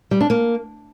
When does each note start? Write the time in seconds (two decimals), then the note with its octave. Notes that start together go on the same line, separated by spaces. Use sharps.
0.11 G3
0.21 D4
0.30 A#3